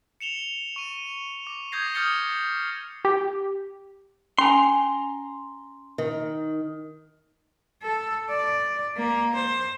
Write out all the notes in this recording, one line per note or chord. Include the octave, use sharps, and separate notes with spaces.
C#7 E7 F7 G7
C#6 D#7
D6
D6 D#6 G6 G#6 A#6 C7
D#6 F6 G6 A6 C#7 G7
G4
C#4 G5 G#5 A#5 C6
D#3
A4
D5
A#3
C5